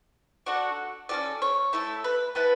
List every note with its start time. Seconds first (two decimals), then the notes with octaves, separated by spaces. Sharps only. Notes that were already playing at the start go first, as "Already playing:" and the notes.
0.46 D4 F#4 A4 F#5
1.09 C#4 F#4 A4 D5
1.42 C#5
1.73 A3 E4 A4
2.04 B4
2.35 B3 E4 A4 B4